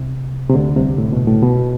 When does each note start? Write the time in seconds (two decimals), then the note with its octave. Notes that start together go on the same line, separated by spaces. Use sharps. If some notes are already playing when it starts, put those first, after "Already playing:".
Already playing: C2 C3
0.50 C3
0.54 D2 D3
0.76 C2 C3
0.98 A2
1.12 B2
1.27 A2
1.42 B2